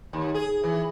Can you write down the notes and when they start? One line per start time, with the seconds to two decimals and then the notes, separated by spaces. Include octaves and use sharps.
0.13 D#2
0.34 G#4
0.64 E3